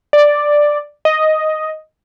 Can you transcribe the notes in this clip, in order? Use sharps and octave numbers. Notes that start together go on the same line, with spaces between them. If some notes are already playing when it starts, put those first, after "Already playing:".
D5
D#5